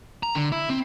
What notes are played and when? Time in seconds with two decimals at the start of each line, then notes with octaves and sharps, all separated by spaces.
0.23 A#5
0.35 D3
0.52 E4
0.70 C4